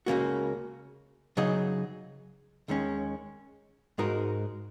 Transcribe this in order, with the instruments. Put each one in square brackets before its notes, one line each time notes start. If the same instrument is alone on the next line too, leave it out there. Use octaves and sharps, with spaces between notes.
[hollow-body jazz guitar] C#2 C#3 A#3 F#4
C#3 F#3 D#4 G#4 D#5
D#2 D#3 G#3 C#4
G#2 G#3 D#4 F#4 A#4